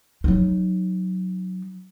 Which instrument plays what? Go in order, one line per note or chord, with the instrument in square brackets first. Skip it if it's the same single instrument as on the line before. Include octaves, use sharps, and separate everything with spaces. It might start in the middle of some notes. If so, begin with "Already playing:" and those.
[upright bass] F#3 D#4